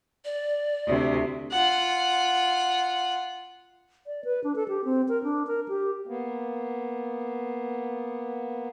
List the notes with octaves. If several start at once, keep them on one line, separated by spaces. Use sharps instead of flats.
D5
D2 C3
F4 F#5
D5
B4
D4
A4
G4
C4
A#4
D4
A#4
G4
A#3 B3